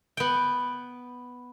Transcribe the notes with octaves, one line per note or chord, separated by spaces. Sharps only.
B3 G5